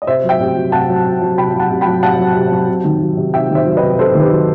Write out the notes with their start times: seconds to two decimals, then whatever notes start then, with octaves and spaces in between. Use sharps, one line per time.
0.02 D#5
0.07 C3 C5 E5
0.24 F#3
0.29 E5 G5
0.40 C3
0.56 F#3
0.72 C3 F#5 A5
0.89 F#3
1.06 C3
1.22 F#3
1.38 C3 G5 B5
1.54 F#3
1.60 F#5 A5
1.70 C3
1.81 G5 B5
1.87 F#3
2.03 C3 F#5 A5
2.19 F#3
2.36 C3
2.52 F#3
2.68 C3
2.85 D#3
3.01 F#3
3.17 C3
3.33 C3 E5 G5
3.50 D#3
3.55 C5 E5
3.66 F#3
3.77 B4 D#5
3.82 C3
3.99 C3 A4 C5
4.15 D#3
4.20 G4 B4
4.31 F#3